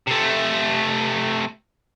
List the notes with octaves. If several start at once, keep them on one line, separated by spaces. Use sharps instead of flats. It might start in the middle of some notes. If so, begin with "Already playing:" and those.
C3 A3